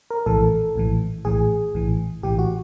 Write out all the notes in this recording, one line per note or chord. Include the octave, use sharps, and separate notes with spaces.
A#4
A#1 A2 E3 A4
A#1 A2 E3
A#1 A2 E3 G#4
A#1 A2 E3
A#1 A2 E3 G4
F#4